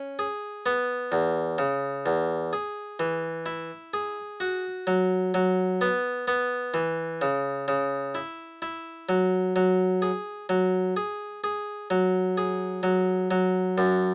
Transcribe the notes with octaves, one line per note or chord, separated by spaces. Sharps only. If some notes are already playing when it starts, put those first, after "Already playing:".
Already playing: C#4
G#4
B3
E2
C#3
E2
G#4
E3
E4
G#4
F#4
F#3
F#3
B3
B3
E3
C#3
C#3
E4
E4
F#3
F#3
G#4
F#3
G#4
G#4
F#3
G#4
F#3
F#3
F#2